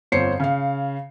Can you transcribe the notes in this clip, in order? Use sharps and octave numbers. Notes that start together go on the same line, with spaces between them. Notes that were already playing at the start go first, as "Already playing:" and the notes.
G1 F2 C5 C#5 C7 C#7
C#3 F5